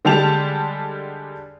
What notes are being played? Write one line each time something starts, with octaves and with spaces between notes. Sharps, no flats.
D3 G3 G#3 G4 A5 F7